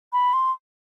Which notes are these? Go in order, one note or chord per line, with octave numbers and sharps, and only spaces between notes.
B5
C6